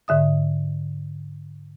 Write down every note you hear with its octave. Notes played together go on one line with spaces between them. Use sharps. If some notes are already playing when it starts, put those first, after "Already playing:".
G#2 D3 E5 D#6